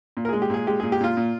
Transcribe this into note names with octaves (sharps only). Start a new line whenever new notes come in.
A#2
A#4
G#3 G#4
G4
A#2 G#4
G#3 G4
A#2 G#4
G4
A#2 F4
A#2